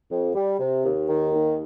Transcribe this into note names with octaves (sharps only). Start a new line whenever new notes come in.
F2
G3
C3
D#2
D#3
D#2